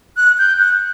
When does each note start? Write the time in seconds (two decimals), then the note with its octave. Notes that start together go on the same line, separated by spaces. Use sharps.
0.17 F#6
0.38 G6
0.60 F#6